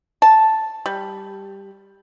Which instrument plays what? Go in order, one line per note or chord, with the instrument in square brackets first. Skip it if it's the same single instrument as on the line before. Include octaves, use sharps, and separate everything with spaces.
[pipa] A5
G3